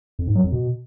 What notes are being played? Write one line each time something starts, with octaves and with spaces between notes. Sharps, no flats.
F2
G#2
F#3
F2
B2